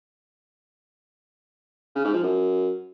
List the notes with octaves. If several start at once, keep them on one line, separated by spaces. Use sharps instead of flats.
C#3
G#2
F3
F#2